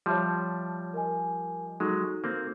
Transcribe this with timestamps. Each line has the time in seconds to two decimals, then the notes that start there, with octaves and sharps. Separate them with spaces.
0.06 F3 G3 C#5 E5 A5 C6
0.94 A#4 D#5 G#5
1.80 F#3 G#3 D#4 F#4 A4
2.24 A#3 C4